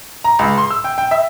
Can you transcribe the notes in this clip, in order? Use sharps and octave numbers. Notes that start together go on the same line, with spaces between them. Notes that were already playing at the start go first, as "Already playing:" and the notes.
A#5
C#2
C6
E6
G5
G5
E5